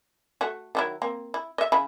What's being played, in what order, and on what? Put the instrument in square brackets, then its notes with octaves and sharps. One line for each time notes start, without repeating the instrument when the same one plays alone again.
[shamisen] A3 F#4
D#3 F#3 E4
A#3 C4
E4
D#5 E5
C#3 E4 B5